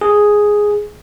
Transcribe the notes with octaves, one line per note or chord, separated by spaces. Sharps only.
G#4